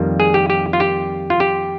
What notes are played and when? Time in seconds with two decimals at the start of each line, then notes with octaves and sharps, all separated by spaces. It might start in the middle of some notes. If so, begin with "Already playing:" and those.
Already playing: F2 D#3 G3 A#3 F4
0.20 G#4
0.34 G4
0.50 G4
0.73 F4
0.80 G4
1.30 F4
1.40 G4